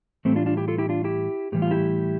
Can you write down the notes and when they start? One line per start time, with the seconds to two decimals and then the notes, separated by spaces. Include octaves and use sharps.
0.25 A2 E3 G3 A3 C4
0.36 D4 F4
0.46 D4 F4
0.57 E4 G4
0.68 F4 A4
0.78 E4 G4
0.89 D4 F4
1.04 E4 G4
1.52 A2 E3 G3 G4
1.62 F4
1.71 E4 G4